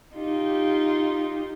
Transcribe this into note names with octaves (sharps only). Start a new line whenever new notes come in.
D#4 F4 G4